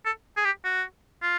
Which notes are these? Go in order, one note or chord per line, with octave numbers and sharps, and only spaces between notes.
A4
G#4
G4
F#4
F4